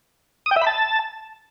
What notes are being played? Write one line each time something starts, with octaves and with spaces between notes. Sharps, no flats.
D#6
G5
E5
B5
A5